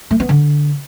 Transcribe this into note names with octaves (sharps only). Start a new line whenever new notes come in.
A3
B3
D3